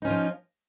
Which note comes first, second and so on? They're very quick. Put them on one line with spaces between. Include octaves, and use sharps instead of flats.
D#4 C#4 F4 F3